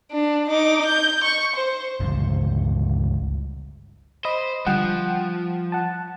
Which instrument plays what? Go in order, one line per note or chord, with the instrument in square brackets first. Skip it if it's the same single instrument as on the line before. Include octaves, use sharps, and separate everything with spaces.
[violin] D4
D#4 D6
G6
C#6
C5
[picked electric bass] G1 C#2
[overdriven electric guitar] C5 [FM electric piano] D#5 B5 D#6
[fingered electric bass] D3 G3 [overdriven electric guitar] F3 [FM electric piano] F#5 G5
[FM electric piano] F#5 A5